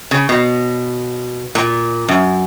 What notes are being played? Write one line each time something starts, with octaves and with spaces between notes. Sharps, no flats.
C#3
B2
A#2
F#2